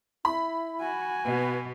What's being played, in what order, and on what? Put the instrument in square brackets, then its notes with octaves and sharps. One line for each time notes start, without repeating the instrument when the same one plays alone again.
[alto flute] E4 [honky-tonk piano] B5
[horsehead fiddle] F#4 G#5
[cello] B2 B3 [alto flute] B4